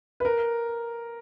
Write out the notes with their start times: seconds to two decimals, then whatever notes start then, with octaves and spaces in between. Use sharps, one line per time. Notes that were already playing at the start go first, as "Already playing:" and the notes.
0.20 B4
0.25 A#4